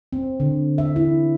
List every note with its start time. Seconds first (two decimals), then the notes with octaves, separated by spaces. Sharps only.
0.13 C4
0.40 D3
0.78 E5
0.96 E4